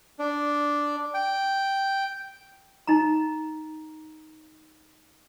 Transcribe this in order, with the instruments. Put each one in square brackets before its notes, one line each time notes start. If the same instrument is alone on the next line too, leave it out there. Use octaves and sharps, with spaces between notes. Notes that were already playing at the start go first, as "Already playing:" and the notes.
[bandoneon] D4
G5
[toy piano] D#4 A#5